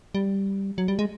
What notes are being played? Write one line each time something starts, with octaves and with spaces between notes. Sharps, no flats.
G3
F#3
G3
G#3